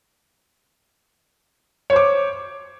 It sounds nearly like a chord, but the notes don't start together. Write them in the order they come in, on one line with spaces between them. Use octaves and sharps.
C#5 C5 D6